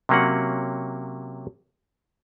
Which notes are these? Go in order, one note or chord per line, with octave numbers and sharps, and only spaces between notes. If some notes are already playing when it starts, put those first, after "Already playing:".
C3 F#3 A#3 C#4 F#5